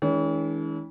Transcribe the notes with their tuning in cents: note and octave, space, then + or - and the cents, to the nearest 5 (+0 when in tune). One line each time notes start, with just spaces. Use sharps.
E3 -35 G#3 +25 C#4 +40